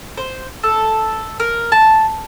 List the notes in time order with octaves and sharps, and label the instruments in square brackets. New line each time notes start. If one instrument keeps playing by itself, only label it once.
[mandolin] C5
A4
A#4
A5